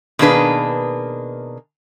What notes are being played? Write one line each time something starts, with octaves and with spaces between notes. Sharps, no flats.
B2 D#3 A#3 D4 G#4 B4